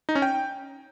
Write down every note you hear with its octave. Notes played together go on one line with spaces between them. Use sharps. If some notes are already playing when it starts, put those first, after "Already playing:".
D#4
C#4
G5